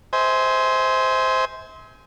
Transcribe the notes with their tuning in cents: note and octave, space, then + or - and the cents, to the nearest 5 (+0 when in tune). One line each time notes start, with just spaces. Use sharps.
C5 -5 E5 -40 G#5 +10